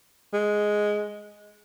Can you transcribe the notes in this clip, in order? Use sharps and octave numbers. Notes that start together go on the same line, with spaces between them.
G#3